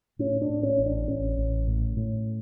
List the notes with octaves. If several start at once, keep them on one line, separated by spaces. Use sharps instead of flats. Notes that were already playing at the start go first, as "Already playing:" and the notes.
A2 C#4
D4
A2
C#4
A1
D4
A1 C#4
A1
A2
A2